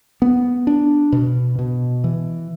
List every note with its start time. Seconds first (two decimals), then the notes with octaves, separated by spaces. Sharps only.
0.22 B3
0.67 D4
1.12 B2
1.59 B2
2.04 E3